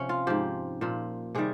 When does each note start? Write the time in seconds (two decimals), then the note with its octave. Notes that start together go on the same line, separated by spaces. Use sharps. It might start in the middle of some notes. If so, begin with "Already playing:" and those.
Already playing: C3 F3 C#4
0.09 F4
0.27 G#2 F3 G4
0.81 A#2 F3
1.35 C3 D#3 G3 G#4